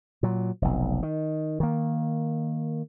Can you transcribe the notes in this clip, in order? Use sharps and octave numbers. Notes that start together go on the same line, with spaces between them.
A#2 F#3
F1 B1
D#3
D#3 A#3